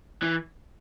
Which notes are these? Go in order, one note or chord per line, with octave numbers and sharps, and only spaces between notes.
E3